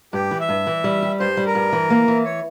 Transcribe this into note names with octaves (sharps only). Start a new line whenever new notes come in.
G2 G4
E3
E5
G2
E3
G3
G4
G2 C5
G3
A#4
G2
E3
A#3
E3
C#5